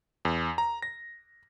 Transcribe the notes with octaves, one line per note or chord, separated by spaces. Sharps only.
E2
A#5
A#6